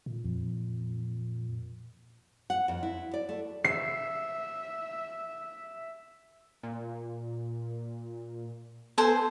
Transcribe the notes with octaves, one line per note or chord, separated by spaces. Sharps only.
A#2
F2
F#5
F2
E4
D5
A3
E5 C7
A#2
B3 A4 C5 G#5